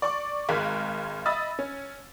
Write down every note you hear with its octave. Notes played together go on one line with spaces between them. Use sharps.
D5 C#6 D6
G#1 G#3 A#4 F5 F#6 B6
D#5 E5 B5 D#6 E6 A6
C#4